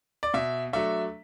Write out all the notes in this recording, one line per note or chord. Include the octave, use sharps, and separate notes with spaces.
D5
B2 E5
F#3 A3 D4 E5